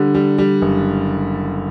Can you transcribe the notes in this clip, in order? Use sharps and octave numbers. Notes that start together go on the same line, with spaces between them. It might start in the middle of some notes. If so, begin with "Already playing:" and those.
Already playing: D3 G3
G3
G3
F#1